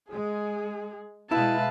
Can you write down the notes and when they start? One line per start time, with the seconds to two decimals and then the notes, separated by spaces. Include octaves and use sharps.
0.11 G#3 G#4
1.31 B2 G#3 E4 B4 E5 F5 A5